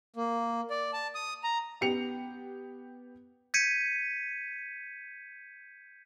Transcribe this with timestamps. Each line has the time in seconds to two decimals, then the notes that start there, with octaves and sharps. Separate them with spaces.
0.16 A#3
0.70 D5
0.93 A5
1.15 D#6
1.44 A#5
1.81 B3 G4 C#7 F7
3.54 G6 G#6 B6 C#7 D#7